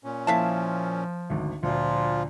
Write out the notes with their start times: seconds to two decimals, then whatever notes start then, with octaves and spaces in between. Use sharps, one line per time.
0.04 A#2 C#4
0.27 F3 A#3 E4 E5 F5 A5
1.30 G#1 D2
1.63 D2 A#2 F3 F4